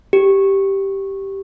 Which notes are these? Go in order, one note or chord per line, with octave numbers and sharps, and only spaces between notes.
G4